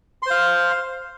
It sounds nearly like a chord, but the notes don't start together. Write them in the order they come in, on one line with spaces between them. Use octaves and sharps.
C6 C5 F5